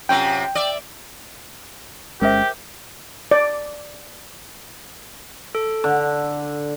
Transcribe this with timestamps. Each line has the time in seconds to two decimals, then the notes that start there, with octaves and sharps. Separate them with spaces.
0.09 F#2 C3 F4 G5
0.55 D5 E5
2.21 G1 G#3 C#4 G4 A#4 C5 E5
3.31 D5
5.55 A4
5.84 D3